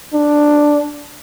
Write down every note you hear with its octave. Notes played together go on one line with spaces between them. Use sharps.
D4